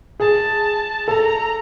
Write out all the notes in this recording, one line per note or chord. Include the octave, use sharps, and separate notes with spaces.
G#4 A5
A4 A#5